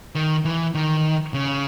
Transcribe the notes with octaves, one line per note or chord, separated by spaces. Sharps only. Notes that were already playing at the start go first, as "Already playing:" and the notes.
D#3
E3
D#3
C#3